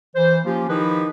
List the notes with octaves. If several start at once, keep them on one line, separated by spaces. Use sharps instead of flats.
E3 C5
F3 A#3 C#4 F4 G4
D#3 F3 D#4 E4 G4 B4